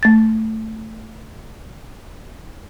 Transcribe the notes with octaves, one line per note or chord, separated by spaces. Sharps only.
A3 A6